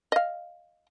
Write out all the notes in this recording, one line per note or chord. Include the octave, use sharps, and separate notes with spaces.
D#5 F5